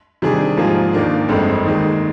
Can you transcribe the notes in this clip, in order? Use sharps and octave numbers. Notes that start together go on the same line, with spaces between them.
C3 D#3 G3 D4 G#4
G#2 F3 A#3 F4 G#4
D#2 D#3 A#3 D4
G1 F2 D3 G#3 C4
D#2 D#3 G#3